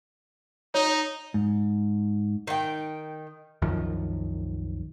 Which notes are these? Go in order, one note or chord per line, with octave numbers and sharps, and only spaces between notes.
D#4 C#5
G#2
D#3 G5
C2 F#2 D#3 F3